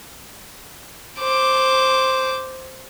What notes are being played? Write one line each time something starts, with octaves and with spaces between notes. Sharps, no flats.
C5 D6